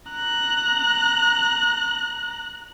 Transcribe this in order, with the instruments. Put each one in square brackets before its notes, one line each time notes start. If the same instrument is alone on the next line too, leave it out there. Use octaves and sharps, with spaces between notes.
[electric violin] A#5 F#6